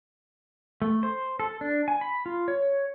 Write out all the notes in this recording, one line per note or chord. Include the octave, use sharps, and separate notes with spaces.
A3
C5
A4
D4
G#5
B5
F4
C#5